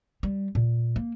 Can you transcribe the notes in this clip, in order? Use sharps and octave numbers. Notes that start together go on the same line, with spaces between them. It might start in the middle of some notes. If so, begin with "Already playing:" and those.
G3
A#2
A#3